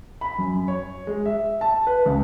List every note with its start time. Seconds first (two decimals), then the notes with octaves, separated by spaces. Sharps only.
0.21 B5
0.38 F#2
0.68 C#5
1.07 G#3
1.25 E5
1.61 A5
1.87 B4
2.05 C#2